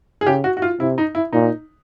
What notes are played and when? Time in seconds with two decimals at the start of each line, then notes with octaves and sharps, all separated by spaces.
0.21 G#4
0.27 C#3 G4
0.44 F#4
0.57 F#4
0.62 F4
0.80 C3 E4
0.98 D#4
1.15 E4
1.33 A#2 D#4